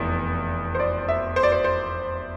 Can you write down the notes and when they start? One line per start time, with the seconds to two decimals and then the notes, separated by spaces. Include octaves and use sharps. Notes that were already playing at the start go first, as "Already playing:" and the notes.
Already playing: F1 E2
0.75 C5
0.80 D5
1.08 E5
1.36 C5
1.43 D5
1.52 C5
1.64 C5